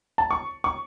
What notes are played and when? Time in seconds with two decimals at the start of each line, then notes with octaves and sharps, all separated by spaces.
0.18 A5
0.31 C#6
0.64 C#6